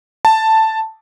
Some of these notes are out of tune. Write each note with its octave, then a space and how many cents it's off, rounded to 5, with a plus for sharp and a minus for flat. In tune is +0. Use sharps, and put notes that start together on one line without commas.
A5 +5